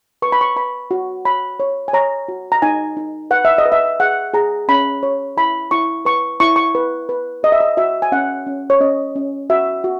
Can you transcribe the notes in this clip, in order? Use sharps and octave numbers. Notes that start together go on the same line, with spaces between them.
B4 C#6
B5
C#6
B4 B5
F#4
C#5 B5
C#5
G#5
C#5 A#5
F#4
A#5
D#4 G#5
D#4
B4 F#5
E5
D#5
B4
E5
G#4 F#5
G#4 A#5
C#4 B5
C#5
E4 B5
E4 C#6
B4 C#6
E4 C#6
C#6
B4
B4
B4 D#5
E5
D#5
F#4 E5
G#5
C#4 F#5
C#4
C#5
C#4 D#5
C#4
F#4 E5
F#4